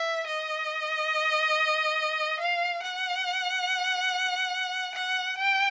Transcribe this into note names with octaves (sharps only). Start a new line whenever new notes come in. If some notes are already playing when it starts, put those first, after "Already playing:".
Already playing: E5
D#5
F5
F#5
F#5
G5